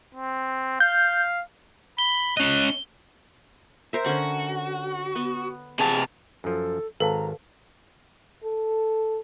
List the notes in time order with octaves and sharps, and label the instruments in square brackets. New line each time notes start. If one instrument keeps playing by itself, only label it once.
[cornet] C4
[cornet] F5 [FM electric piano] G6
[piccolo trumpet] B5 [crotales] G7
[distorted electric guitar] C#4 D#5 [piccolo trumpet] F#6
[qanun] A#4 C5 E5
[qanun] D3 C#4 [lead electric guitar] F#4
[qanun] B3
[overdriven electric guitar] C3 A5 [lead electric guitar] G#4
[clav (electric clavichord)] F#2 F3 [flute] A4
[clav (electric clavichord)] G#1 [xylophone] A4 [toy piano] B4 F5 A5 [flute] A#5
[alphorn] A4